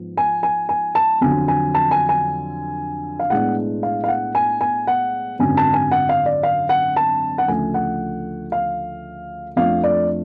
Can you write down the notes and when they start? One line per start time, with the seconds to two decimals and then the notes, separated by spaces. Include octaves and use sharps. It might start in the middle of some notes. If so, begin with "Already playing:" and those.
Already playing: G#2 F3 B3
0.17 G#5
0.43 G#5
0.69 G#5
0.95 A5
1.21 F2 D3 F#3 G#5
1.48 G#5
1.74 A5
1.91 G#5
2.09 G#5
3.20 F5
3.30 B1 A2 G#3 B3 D4 F#5
3.83 F5
4.04 F5
4.08 F#5
4.35 G#5
4.61 G#5
4.87 F#5
5.39 G#1 F#2 D3 F#3 G#5
5.57 A5
5.74 G#5
5.91 F#5
6.09 F5
6.26 D5
6.43 F5
6.69 F#5
6.96 A5
7.38 F#5
7.48 D2 C#3 F3 A3 G#5
7.74 F#5
8.52 F5
9.56 F2 F3 A3 D4 F5
9.83 D5